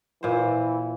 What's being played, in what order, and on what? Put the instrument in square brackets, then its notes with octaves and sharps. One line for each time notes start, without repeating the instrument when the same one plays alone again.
[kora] A#2 C5 [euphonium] E3